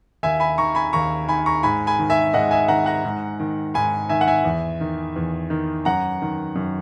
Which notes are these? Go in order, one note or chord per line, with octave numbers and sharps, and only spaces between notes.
D#2 E5 G#5
G#5 B5
D#3 A#5 C#6
G#5 B5
D#2 A#5 C#6
D#3 G#5 B5
A#5 C#6
G#2 G#5 B5
G#5 B5
D#3
E5 G#5
G#2 D#5 F#5
E5 G#5
D#3 F#5 A#5
F#5 A#5
G#2
D#3
G#2 G#5 B5
D#3 E5 G#5
F#5
E5 G#5
E2
D#3
E2
D#3
F#2 F#5 A#5
D#3
F#2